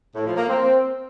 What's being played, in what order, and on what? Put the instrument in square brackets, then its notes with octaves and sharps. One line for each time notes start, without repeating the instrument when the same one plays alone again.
[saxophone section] A2
F3
A#3
C4